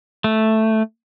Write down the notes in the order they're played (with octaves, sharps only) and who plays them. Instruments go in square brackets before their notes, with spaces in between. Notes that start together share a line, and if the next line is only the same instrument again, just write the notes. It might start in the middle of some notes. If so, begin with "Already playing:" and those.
[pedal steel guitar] A3